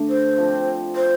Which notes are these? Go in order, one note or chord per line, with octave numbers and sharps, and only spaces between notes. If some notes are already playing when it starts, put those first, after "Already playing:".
Already playing: D3 A3 D4
C5
F3 C4 G4
C5